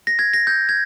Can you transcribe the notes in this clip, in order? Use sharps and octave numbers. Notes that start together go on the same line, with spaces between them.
A#6
G#6
A#6
G6
G#6